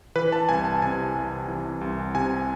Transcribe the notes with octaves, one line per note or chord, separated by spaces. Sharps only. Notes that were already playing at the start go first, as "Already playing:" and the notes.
E3 B4
A5
C2 G#5
A5
C3 G#5
C2
E3
C2
C3 G#5